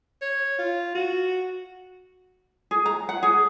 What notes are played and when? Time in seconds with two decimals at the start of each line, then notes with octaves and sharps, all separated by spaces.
0.22 C#5
0.59 F4
0.95 F#4
2.71 G#4
2.86 A#5
3.09 F#5
3.23 G#4